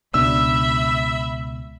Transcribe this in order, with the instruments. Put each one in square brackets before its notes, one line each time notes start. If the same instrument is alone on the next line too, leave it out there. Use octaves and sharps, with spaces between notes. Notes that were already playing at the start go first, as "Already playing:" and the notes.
[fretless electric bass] C#2 B2 D4 [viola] E5 B5 [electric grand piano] E6